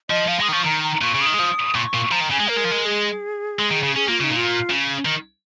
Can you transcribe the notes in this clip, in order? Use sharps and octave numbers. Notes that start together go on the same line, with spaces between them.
F3 D#5
F3 F5
G#3 D#6
D#3
F3 C#6
D#3 A#5
A#5
A#2 C#6
C#3
D#6
D#3
G#3
F3
A#2 C#6
A#2
F3 A#5
D#3
C#3 G#5
G#3
A#3 A#4
G#3
F3
G#3
G#4
G#3
D#3
C#3
C#4 G#4
A#3 F4
C#3 D#4
A#2 F4
C#3
D#3